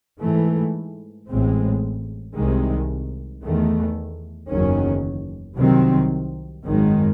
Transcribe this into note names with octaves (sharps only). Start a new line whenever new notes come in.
G#2 E3 A3
A1 A2 G#3 C4
C2 C3 D#3 G#3
E2 D#3 A3
F#1 E2 D#3 F#3 C#4
C2 C3 D#3 F#3 C4
G#1 F#2 D#3 G#3